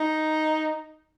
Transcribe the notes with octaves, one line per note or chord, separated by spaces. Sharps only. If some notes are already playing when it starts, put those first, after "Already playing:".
Already playing: D#4